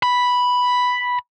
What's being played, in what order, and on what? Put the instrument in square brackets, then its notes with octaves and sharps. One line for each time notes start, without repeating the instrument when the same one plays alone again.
[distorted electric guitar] B5